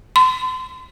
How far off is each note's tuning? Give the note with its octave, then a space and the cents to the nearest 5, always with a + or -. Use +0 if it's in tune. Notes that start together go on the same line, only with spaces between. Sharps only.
C6 -40